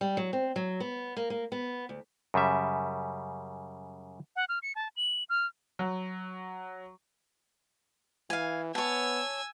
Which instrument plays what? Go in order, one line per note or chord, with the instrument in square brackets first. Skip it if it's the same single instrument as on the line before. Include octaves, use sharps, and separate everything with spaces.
[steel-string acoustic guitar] G3
F#3
C4
F#3
B3
A#3
A#3
B3
D2
[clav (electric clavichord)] F#2 C#3 G3 E5
[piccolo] F#5
F6
C#7
A5
F#7
F6
[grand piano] F#3
[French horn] E3 [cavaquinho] F5 G#5
[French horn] B3 [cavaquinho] C#5 A5 [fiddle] G#5 E6